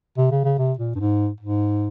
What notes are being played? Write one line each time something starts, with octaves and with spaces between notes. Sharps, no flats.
C3
C#3
C#3
C3
A#2
G2
G#2
G#2